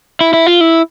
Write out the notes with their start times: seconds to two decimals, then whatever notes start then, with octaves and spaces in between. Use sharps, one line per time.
0.21 E4
0.33 E4
0.46 F4
0.61 E4